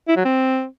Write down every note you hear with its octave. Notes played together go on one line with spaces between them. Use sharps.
E4
F#3
C4